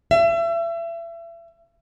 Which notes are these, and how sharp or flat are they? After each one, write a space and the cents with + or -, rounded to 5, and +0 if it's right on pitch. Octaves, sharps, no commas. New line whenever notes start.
E5 +35